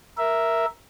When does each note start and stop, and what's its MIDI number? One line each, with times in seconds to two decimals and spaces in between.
0.18 0.66 70
0.18 0.66 76